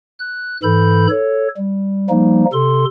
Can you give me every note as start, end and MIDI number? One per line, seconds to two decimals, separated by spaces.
0.20 0.57 90
0.63 1.07 44
0.63 1.07 52
0.63 1.07 69
0.63 1.07 83
0.63 1.07 91
1.09 1.48 69
1.09 1.48 73
1.57 2.08 55
2.10 2.45 53
2.10 2.45 55
2.10 2.45 58
2.10 2.45 63
2.53 2.85 48
2.53 2.85 69
2.53 2.85 84